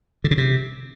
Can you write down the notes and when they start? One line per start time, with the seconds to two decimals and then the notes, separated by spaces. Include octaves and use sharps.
0.24 D3
0.31 C#3
0.38 C3